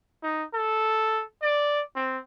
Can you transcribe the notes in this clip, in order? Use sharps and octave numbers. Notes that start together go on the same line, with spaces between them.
D#4
A4
D5
C4